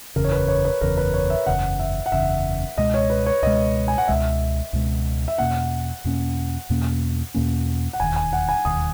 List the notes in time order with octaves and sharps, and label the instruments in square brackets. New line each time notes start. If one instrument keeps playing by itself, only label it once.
[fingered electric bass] F#1 E2 C#3 [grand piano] A#4
[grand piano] C#5
B4
C#5
B4
[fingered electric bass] F#1 E2 C#3 [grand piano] A#4
[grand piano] B4
C#5
E5
[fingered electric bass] F#1 E2 C#3 [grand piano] F#5
[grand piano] E5
F#5
[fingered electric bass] F#1 E2 C#3 [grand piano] E5
[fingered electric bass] C#2 B2 G#3 [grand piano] D#5
[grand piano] C#5
B4
C#5
[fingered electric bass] C#2 B2 G#3 [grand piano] D#5
[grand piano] G#5
F#5
[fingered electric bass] C#2 B2 G#3 [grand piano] E5
[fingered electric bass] C#2 B2 G#3
[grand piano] E5
[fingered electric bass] E2 B2 A#3 C#4 [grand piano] F#5
[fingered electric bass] E2 B2 A#3 C#4
E2 B2 A#3 C#4
E2 B2 A#3 C#4
[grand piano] F#5
[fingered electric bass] E1 D#2 D#3 [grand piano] G#5
[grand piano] G#5
F#5
G#5
[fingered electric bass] E1 D#2 D#3 [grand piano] D#6